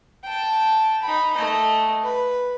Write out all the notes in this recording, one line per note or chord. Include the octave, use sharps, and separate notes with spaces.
G5 A5
D#4 B5
A3 D#5
B4